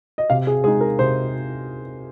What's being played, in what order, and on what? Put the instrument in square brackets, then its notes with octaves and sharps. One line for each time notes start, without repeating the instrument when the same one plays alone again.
[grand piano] D#5
C3 F5
G#4
G#3 D#4 G#4
A#4
C3 C5